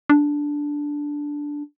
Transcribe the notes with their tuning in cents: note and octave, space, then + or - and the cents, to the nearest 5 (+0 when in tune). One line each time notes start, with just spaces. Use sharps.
D4 -5